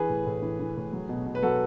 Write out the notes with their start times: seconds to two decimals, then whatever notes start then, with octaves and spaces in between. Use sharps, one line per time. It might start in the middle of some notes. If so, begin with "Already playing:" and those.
Already playing: E3 G#4 B4
0.09 A2
0.26 A2
0.42 E3
0.59 E3
0.77 A2
0.93 F#3
1.09 B2
1.26 B2
1.35 B4
1.43 F#3 F#4 A4